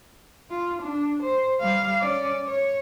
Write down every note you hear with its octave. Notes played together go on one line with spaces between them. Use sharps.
F4
D4
C5
G3 F5
C#4 D5
C#5